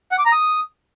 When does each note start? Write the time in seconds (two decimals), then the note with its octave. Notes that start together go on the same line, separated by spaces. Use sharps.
0.12 F#5
0.19 D6
0.25 A#5
0.32 D#6